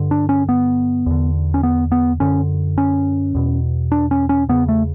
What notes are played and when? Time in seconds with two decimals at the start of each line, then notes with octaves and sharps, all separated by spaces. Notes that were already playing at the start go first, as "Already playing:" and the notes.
Already playing: G2 D3
0.11 D4
0.29 C#4
0.49 B3
1.06 E2 D3
1.54 C#4
1.63 B3
1.92 B3
2.20 F#2 D3 C#4
2.78 C#4
3.35 E2 B2
3.92 D4
4.11 C#4
4.29 C#4
4.49 E2 C#3 B3
4.69 A3